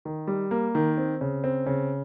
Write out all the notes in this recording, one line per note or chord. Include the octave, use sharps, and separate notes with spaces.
D#3
G3
A#3
D#3
C4
C#3
C4
C#3